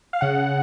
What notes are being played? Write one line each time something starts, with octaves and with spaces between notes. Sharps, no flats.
F5
C#3 F#5